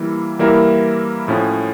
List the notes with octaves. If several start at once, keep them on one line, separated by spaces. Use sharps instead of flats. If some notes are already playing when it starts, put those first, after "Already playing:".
Already playing: E3 G3 A#3 E4
E3 G3 A#3 E4 A#4
A2 F3 C#4